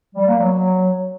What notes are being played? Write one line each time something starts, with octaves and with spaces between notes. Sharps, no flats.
G3
A#3
F#3